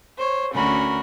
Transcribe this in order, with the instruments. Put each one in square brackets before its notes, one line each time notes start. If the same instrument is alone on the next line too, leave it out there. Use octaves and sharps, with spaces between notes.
[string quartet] C5 C#5
D2 C#4 F#4 A#4 B5